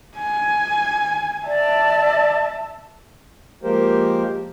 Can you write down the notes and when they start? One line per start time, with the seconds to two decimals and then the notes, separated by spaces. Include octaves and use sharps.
0.18 G#5
1.47 D5 E5 A5
3.64 F3 G#3 A#3 G4 A#4 C5